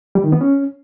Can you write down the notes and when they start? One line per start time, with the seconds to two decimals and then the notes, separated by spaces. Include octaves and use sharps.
0.15 G3
0.24 D#3
0.32 B3
0.41 C#4